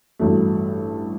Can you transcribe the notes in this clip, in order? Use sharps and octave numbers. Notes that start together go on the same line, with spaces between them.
A1 G2 F#3 A3